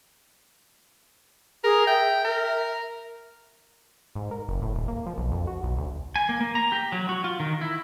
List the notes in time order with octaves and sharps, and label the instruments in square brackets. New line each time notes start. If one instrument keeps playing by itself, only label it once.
[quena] G#4 [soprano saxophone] A#4
[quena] E5 [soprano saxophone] G5
[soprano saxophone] A#4
[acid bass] G#2
A#4
F#1
A2
D#1
A#3
F3
B1
F2
F#4
B1
D2
[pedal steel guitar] G#5
A#3
A#3
A#5
G4
F#3
F#4
F4
D#3
E4